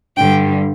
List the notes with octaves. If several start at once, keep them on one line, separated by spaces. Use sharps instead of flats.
G2 D3 G3 G5